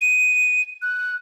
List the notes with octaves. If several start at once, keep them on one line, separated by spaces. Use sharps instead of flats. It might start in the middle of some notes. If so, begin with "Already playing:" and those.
D#7
F#6